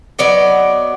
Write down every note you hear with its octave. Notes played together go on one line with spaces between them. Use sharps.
F#3 B3 D5 D#5